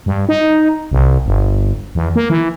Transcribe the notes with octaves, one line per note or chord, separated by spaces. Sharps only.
G2
D#4
C2
G1
E2
A#3
E3